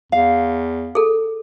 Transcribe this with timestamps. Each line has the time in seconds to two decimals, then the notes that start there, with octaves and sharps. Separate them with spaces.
0.12 E2 F5
0.95 G#4 A4